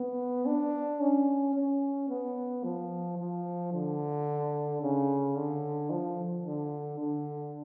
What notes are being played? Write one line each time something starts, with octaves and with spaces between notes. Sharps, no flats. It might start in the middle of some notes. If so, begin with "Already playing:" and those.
Already playing: B3
D4
C#4
C#4
B3
F3
F3
D3
C#3
D3
F3
D3
D3